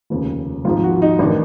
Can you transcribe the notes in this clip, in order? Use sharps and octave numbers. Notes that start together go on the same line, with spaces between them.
F1 D#2 C#3
G#1 G#2 F3 F4
F#4
D#4
A1 D#3 D4